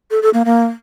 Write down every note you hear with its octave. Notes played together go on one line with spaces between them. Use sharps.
A4
A4
A#3
A#3